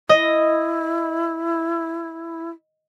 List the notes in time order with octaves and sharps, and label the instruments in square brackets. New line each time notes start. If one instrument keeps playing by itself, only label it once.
[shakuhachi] E4 [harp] D#5